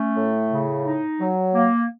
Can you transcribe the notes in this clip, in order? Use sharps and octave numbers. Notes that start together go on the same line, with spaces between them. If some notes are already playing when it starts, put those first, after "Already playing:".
Already playing: A3 C#4
A2
C#3
D#4
F#3
A#3